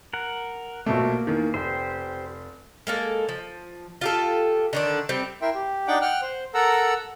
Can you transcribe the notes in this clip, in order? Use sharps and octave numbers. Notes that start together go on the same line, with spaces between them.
A#4 F#5
A#1 B2 A3 A#3
E2 D#3
F1 G4 C5
G#3 A#3 A4
F3
F4 G4 A4
D3 D#3 D4
G3 C4
E4 A#4 E5 G5 C6
G4
D4 D#4 F#5 G5 D6
F#5 G5 F6 F#6
C5
A4 A#4 F#5 A#5 E6